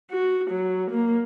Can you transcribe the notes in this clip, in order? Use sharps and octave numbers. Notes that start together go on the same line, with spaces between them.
F#4
F#3
A#3